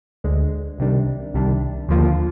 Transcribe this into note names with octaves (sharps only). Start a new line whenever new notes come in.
D2 D3 G#3
C2 C3 D#3 G3 D4
C2 C3 D#3 G3 D4
D#2 D3 F3 A#3 F4